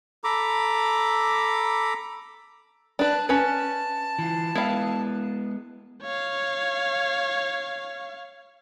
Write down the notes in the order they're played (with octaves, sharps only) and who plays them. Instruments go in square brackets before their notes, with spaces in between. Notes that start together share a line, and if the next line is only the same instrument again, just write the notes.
[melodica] A4 A#5 B5 D6
[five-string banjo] D4 B4 [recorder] A5
[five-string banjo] C#4 B4 [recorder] A5
[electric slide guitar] E3 F4
[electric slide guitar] G#3 B3 [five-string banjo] E4 F5
[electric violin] C#5 F5